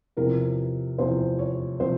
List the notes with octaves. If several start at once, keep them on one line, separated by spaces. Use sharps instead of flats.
E2 C3 F3 C4 A#4
E2 C3 F3 C4 C5
C#5
C3 F3 C4 C5